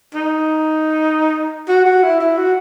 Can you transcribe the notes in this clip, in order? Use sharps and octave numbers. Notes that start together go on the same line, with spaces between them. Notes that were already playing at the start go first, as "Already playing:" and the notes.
D#4
F#4
F#4
E4
E4
F#4